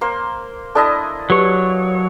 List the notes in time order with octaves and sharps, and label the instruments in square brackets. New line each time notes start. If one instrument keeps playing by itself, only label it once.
[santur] A#3 C5
[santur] D4 E4 D#5 [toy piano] A4 A5 D#6
[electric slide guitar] F#3 C#5 [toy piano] G4 B4